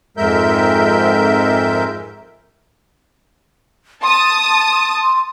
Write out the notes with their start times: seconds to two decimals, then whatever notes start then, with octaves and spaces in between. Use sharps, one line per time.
0.17 F2 G#2 G#3 A#4 E5 G6
4.03 A5 C6 D#6